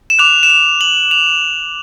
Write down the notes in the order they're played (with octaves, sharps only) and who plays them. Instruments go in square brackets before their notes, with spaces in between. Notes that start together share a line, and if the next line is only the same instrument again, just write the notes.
[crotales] E7
D6 F#6 F7
E7
F7
F#7
F7